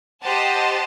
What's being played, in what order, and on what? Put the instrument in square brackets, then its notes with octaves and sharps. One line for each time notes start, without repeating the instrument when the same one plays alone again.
[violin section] G4 C5 D#5 F#5 A5